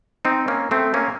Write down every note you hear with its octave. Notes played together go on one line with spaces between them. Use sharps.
C4 D#4
A#3 C#4
A3 C4
A#3 C#4